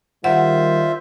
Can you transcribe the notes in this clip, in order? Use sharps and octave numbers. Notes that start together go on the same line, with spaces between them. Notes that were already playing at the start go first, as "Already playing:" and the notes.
D#3 G3 F4 C5 E5 F#5